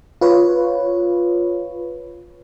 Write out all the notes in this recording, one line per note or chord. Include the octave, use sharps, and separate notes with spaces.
F4 B4 C#5